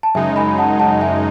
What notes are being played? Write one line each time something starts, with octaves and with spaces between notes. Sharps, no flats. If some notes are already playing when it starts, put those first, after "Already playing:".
A5
F#2 C#3 G#3 D#4 E5 G#5
G#5 B5
F#5 A5
F#5 A5
E5 G#5